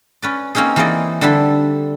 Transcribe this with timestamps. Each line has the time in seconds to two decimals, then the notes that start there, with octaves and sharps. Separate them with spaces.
0.22 C#4 B4 D5
0.55 A#3 C4 C#4 D#4 G#4
0.76 E3 A#3 D#4 G#4 D5 D#5
1.21 D3 G3 D4 A4 E5